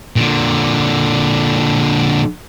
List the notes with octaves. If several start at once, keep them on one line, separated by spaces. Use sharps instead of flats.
A#2 D3